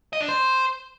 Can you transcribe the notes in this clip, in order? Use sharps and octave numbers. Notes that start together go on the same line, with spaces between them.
D#5
D4
C5